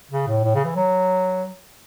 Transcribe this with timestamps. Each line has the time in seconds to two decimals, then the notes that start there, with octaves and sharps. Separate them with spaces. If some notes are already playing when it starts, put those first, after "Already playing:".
0.11 C#3
0.27 A2
0.44 A2
0.55 C#3
0.65 E3
0.76 F#3